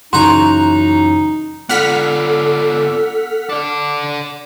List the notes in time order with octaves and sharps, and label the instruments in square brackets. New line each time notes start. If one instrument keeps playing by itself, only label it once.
[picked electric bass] F#2 C#3 E3 [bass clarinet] D#4 [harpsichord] F#4 A#5 [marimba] C6
[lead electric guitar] B3 F4 [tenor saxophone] D4 [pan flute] A4 [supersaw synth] F#5 F6 B6
[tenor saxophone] D4 [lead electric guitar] A4 D5